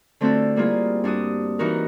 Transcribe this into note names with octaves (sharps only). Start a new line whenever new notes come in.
D3 A3 C4 F4 F#4 A4
G3 A#3 E4 F4 G#4
G2 D4 F#4 D#6
E3 D#4 F#4 A#4